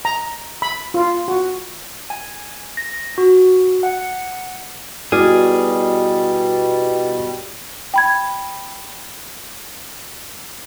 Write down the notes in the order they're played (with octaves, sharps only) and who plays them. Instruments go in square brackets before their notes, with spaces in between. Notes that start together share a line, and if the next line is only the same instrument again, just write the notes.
[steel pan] A#5
B5
F4
F#4
[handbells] G#5
A#6
F#4
F#5
[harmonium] B2 G3 [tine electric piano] E4 F#4 F6 [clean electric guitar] G#4 [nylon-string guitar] D5
[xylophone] G5 B5 G#6